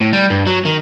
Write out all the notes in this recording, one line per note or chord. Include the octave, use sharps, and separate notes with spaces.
A2
G3
G2
F#3
D#3